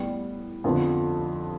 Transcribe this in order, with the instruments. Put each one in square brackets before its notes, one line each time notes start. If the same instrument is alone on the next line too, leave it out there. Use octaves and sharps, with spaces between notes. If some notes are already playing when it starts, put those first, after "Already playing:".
Already playing: [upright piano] A2 G3 B3
F2 D3 F3 B3